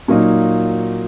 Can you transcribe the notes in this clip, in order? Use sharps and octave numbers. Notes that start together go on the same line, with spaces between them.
A#2 F#3 A#3 D#4